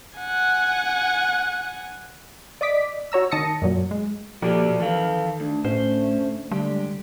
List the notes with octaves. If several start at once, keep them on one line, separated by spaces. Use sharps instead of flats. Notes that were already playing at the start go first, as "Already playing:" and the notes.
F#5 G#5
D5 D#5 D6 B6
F#4 C#5 A#5 E6
D#3 A5 D#6 A#6 C#7
F#2 A#2 F#3
G#3
A#2 F3 F#4 G4 A4 D5
D#3 E3 A4 F5
D2 D4
A2 A3 C#4 C5
D3 G3 G#3 G4